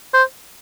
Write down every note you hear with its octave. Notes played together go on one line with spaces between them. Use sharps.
C5